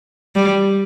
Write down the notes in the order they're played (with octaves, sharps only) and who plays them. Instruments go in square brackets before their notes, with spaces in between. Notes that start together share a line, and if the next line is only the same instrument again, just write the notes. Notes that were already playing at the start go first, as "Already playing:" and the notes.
[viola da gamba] G3